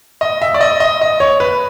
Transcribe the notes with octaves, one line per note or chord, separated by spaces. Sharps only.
D#5
E5
D5
D#5
D#5
D#5
C#5
B4